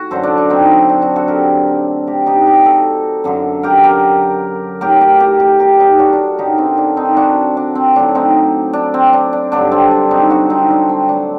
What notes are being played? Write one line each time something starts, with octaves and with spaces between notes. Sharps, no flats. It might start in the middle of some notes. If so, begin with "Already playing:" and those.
Already playing: A2 F#4
F#2 D3 F#3 A4 C5
D4
D4
C4 D#4
D4
D4 F#4
F#4 A4
G4 A#4
A2 F#3
G4 A#4
D#4 G4
D#4 G4
F#4 A4
F#2 D3 F#3
G4 A#4
G4 A#4
A2 F#3 G4 A#4
G4 A#4
G4 A#4
G4 A#4
G4 A#4
D#4 G4
D4 F#4
D4
F#2 D3 F#3 D#4 G4
C4 D#4
D4
C4 D#4
D4 F#4
D4
C4
A2 F#3 D4
C4 D#4
D4
C4
D4
D4
G2 D3 F#3 D4
C4
D4
C4 D#4
D4 F#4
C4 D#4
D4
C4
A2 F#3 D4